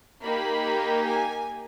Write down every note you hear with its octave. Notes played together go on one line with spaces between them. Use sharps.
A#3 D#4 G4 B5
G#5